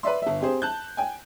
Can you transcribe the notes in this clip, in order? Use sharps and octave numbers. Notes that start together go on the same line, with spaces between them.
B4 D5 E5 C6
G1 E5
C4 G4 G#4 C5
A5 F#6 G6
G5 G#5